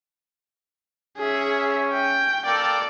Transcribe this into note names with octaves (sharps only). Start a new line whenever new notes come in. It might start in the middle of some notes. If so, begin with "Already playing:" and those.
C#4 G#4 E5
G5
A#3 A4 D5 G5